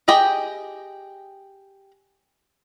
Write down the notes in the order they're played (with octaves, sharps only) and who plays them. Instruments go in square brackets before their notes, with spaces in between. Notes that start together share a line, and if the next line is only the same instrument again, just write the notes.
[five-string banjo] G4 G#4 D#5 G5